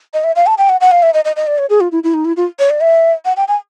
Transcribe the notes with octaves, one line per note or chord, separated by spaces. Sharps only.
D#5
E5
F5
A5
G5
F#5
F#5
F5
E5
D#5
D#5
D#5
D5
C#5
G#4
F4
E4
E4
D#4
E4
F4
C#5
D5
E5
F#5
G5
G#5